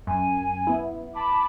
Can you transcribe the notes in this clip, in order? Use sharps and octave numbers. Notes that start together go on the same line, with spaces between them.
F#2 G#5
B3 E4
A5 B5 D6